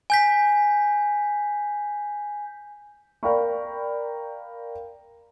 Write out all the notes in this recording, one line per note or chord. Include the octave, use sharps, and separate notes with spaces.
G#5 G6 B6
A#4 D5 F5 G5 B5 C#6